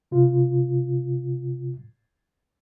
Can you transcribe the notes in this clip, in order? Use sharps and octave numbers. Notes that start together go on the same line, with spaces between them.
C3 F4